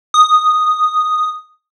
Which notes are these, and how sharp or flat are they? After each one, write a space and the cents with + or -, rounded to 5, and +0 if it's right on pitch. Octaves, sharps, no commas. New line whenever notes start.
D#6 -5